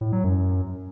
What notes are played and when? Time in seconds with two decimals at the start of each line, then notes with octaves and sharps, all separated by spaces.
0.01 A2
0.12 F#3
0.24 F#2